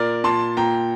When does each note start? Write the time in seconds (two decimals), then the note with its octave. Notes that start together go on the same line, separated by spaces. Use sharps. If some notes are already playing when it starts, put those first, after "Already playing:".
Already playing: A#2 A#4 D5
0.24 A#2 A5 C6
0.57 A#2 G5 A#5